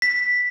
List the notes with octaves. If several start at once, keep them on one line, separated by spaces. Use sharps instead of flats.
B6